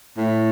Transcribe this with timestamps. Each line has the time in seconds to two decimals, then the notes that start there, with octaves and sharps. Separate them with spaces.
0.17 A2